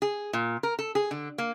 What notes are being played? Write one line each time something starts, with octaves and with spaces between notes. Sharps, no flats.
G#4
A#2
A#4
A4
G#4
D3
A#3